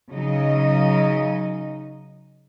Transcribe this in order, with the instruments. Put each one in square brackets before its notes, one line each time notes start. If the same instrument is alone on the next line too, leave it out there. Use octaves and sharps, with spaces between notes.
[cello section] C#3 F#3 D#4 D#5